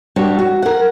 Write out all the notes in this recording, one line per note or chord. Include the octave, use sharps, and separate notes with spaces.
G3 D4 F#4 C#5
F#4
A#4 F#5